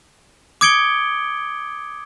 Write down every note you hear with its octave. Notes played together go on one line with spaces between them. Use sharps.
D6 D#6 G#6 C#7 D7 G7